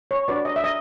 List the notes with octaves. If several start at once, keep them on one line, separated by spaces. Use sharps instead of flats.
C#5
D4 F#4 B4 D5
D#5
E5
D#5